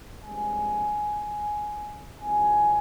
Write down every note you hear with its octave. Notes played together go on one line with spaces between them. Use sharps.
G2 F3 G#3 C4 G#5
C2 C3 F3 G#5